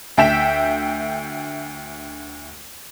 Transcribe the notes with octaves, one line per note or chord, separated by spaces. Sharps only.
D2 E5 G5 B6 E7